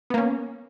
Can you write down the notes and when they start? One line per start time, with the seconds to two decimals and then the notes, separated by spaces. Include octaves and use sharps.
0.10 B3
0.14 A#3
0.18 C#4